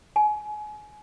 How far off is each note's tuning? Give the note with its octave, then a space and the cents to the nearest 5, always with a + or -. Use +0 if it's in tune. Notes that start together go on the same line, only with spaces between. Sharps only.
G#5 +25